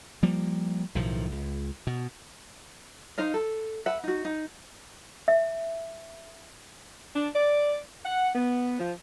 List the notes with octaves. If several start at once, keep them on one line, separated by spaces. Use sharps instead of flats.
F3 G3 A#3
B1 A2 D#3 F3
C#2
B2
D#4 C5 D#5 F5
A4
B4 E5 F#5
D#4 F#4
D#4
E5
D4
D5
F#5
B3
F3